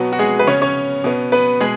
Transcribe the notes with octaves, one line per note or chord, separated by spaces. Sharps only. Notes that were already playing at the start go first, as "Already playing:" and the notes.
Already playing: B2 F#3 B3 F#4
F#4
G#3 G#4
B4
C#3 B3 C#4 C#5
C#4 C#5
B2 B3
B3 B4
B2 G#3 G#4